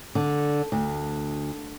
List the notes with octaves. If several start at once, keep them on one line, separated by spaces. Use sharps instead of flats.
D3
D2